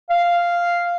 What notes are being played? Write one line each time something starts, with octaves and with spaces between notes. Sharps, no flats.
F5